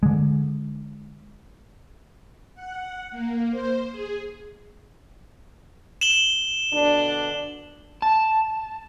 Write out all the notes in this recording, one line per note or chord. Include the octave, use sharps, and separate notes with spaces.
D3 G#3
F#5
A#3
C5
G#4
E7 F#7 G7
B2 D3 D4
A5